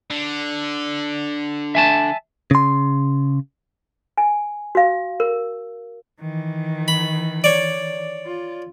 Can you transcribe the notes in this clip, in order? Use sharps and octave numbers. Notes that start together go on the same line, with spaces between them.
D3
E5 G#5 A5
C#3 C6
G#5
F#4 F5
A#4
D#3 E3
B5
C#5 D5
F4